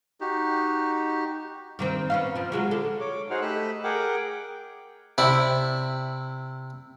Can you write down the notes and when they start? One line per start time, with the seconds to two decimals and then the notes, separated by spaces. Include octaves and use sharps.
0.21 D#4 F#4 G4
1.79 G2 D#3 C4
2.10 B3 C#4 F5
2.36 F3 C4
2.52 F#3 G#3 F4
2.71 D3 A4
3.01 C#5 D6
3.30 D#4 F#4 G#4 C5 F#5 F6
3.42 A3 G4 D#5 B5 E6 F#6
3.84 G#4 A#4 F#5 G5 D6
5.18 C3 E4 D5